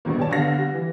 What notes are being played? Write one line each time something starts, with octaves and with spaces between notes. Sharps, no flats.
A#1 G2 B2 D#3 A#3
A#3 G4 C#5 D5 A5
D3 B3 F5 A#6
G3
E3